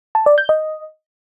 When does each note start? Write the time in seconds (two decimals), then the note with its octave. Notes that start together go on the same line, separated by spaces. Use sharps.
0.15 A5
0.26 D5
0.38 G6
0.49 D#5